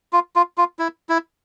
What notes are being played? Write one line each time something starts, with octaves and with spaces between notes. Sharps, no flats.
F4
F4
F4
E4
E4